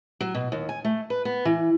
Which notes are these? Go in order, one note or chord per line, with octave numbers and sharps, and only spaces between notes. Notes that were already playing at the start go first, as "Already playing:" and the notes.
F#3
B2
D#2
G#5
A3
B4
B3
E3